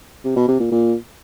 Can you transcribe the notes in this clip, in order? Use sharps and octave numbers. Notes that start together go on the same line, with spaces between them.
C3
B2
C3
A#2
A#2